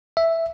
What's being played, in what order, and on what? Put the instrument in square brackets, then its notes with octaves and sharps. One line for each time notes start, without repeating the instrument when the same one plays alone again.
[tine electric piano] E5